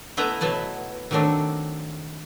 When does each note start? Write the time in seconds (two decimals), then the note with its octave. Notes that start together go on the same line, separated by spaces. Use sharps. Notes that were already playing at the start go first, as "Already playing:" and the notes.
0.17 A3 B3 E4 B4 D#5 A#5
0.41 B2 F#3 B3 B4 A5
1.11 D#3 F#3 A3 C4 D4